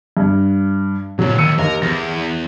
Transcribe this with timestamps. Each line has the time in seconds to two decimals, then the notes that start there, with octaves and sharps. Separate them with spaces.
0.17 G2
1.19 A#2 C#3 F#3
1.38 D#2 E6 C#7 D#7
1.59 D#2 A#4
1.82 E2 A#6